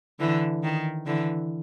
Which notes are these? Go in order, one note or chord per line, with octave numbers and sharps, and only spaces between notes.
D3 E3
D#3
D3 E3